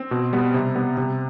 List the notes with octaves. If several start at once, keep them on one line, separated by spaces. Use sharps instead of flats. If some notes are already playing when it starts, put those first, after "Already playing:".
Already playing: C4
B2
G3 B3
C3
G3 B3
C3